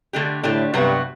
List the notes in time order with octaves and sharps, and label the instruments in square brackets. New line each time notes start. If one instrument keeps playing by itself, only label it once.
[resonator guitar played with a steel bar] D3 A3 D4 G4
[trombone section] A2 [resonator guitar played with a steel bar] D3 A3 D4 G4
[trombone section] G2 [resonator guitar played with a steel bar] C3 F#3 B3 F#4